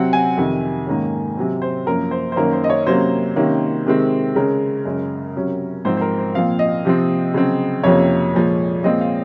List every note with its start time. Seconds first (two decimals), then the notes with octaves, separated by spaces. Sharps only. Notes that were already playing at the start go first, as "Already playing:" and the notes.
Already playing: C3 F#3 C4 F#5
0.13 G#5
0.37 F2 C3 D#3
0.87 G#2 D#3 A#3 C#4
1.37 C3 F#3 C4
1.62 C5
1.86 F#2 F3 A#3 C#4 A#4
2.11 C5
2.32 C5
2.36 F#2 D#3 A#3 C#4 A#4
2.53 C5
2.64 D#5
2.70 C#5
2.86 C3 F#3 A#3 C#4 C5
3.36 C3 D#3 A#3 C#4
3.86 C3 D#3 G#3 C4
4.35 C#3 G#3 C#4 A#4
4.85 F#2 C#3 G#3 C#4
5.36 C3 F#3 C#4
5.85 G#2 F3 C4 C5
5.97 C5
6.01 A#4
6.18 C5
6.34 A#2 F3 C4 F5
6.59 D#5
6.85 C3 F3 C4
7.34 C#3 F#3 C4
7.84 F2 C3 F3 A#3 C#4 C#5
8.34 A#2 F3 G#3
8.84 A#2 F3 G#3 C4 D#5
9.01 F5